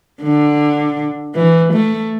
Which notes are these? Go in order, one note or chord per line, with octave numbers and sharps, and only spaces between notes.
D3
E3
A3